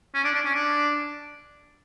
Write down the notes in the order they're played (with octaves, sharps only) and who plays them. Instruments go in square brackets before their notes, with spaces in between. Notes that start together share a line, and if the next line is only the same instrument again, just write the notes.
[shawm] C#4
D4
D4
C#4
D4